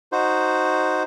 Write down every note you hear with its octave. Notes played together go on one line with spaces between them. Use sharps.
D#4 F#4 C5